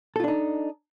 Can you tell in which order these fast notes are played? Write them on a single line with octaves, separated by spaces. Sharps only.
A4 F4 D4 D#4